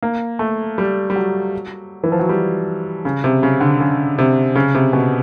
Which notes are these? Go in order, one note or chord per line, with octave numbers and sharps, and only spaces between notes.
A#3
A3
G3
G3
F#3
E3
F3
F#3
G3
C#3
C3
C#3
D3
C#3
C3
C#3
C3
B2